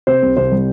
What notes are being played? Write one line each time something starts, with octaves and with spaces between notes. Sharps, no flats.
C3 C5
C2
C2 C5
G3